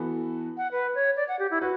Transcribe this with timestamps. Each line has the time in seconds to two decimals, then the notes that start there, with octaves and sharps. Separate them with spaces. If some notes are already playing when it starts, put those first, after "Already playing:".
Already playing: E3 B3 F#4 A4
0.57 F#5
0.72 B4
0.95 C#5
1.16 D5
1.28 F#5
1.39 G4
1.51 E4
1.61 F#4 B4